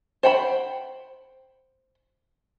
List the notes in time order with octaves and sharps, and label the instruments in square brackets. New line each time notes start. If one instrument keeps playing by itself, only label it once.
[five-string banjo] C5 F#5 G5 A#5 B5